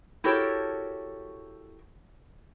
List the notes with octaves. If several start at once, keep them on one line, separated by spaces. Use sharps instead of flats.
E4 F#4 G4 A4 A#4 C#5